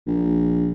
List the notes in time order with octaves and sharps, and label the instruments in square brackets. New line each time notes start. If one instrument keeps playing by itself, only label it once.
[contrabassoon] A#1